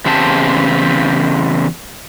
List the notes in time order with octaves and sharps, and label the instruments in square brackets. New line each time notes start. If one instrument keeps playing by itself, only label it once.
[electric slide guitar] E2 C#3 C4 G4 A5